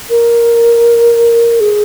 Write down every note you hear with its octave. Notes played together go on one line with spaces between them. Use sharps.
A#4
G#4